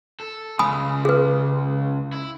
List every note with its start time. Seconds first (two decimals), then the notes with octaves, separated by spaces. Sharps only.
0.20 A4
0.59 C#2 C#3 G#5 B5 D#6
1.05 G#4 B4
2.13 E4